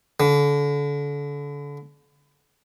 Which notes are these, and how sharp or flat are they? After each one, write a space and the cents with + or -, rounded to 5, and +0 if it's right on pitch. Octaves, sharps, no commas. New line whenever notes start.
D3 -35